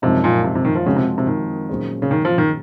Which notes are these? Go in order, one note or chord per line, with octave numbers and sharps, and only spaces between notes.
F#2 C3 F3 G#3 D#4
A#2
C3
C3
D#3
F3
C#3 F3 G#3 C4 F#4
C3
C3
D#3
A#2 F#3 C#4 G#4 C5
C#3
D#3
F3
D#3